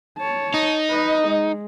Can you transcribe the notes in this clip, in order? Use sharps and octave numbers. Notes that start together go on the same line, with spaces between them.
C#5 A5
D#4
B4 D#5
G#3